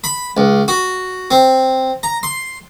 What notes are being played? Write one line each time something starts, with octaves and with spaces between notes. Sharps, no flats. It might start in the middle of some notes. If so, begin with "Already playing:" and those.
B5
C#2
F#4
C4
A#5
C6